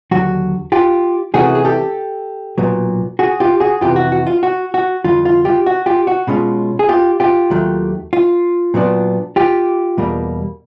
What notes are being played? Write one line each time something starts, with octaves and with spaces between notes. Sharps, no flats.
D#2 D3 F#3 F#4
F4 G4
C3 E3 A3 C#4 F#4 G#4
G#4
G4 A4
B1 A#2 F#3 B3
F#4 G#4
F4 G4
F#4 G#4
F2 C3 E3 F4 G4
F#4
F#4
F4
F#4
F#4
F2 D3 G3 F4
F4
F4 G4
F#4
F4 G4
F#4
B2 G#3 C#4 F4
G#4
F4 G4
F4 G4
D#2 D#3 F#3 A3
F4
A#2 F#3 B3 D4
F4 G4
E2 B2 G3 A#3